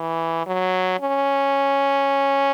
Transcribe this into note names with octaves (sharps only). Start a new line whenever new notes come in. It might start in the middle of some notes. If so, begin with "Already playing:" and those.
Already playing: E3
F#3
C#4